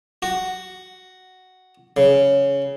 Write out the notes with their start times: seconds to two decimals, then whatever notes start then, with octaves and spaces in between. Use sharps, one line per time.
0.23 F#4
1.97 C#3